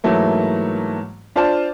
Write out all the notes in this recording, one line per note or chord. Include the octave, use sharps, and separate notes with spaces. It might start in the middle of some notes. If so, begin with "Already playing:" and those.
G#2 E3 F#3 A3 A#3
D4 F4 C5 D5 A5